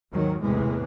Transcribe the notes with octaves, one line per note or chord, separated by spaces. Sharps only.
D#2 G#2 D#3 F#3
E2 A2 C3 E3 G#3